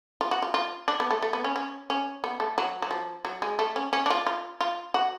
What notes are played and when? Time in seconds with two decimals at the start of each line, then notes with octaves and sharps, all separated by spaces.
0.21 F4
0.31 F#4
0.42 F4
0.54 F4
0.88 D4
1.00 B3
1.11 A3
1.22 A3
1.33 B3
1.44 C#4
1.56 C#4
1.90 C#4
2.24 B3
2.40 A3
2.58 F#3
2.82 F#3
2.91 F3
3.25 F#3
3.42 G#3
3.59 A3
3.76 C#4
3.93 C#4
4.06 D4
4.10 F4
4.27 F4
4.61 F4
4.94 F#4